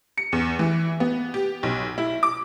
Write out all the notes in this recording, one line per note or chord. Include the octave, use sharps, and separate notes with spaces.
C#7
E2
E3
B3
G4
B1
E4
D6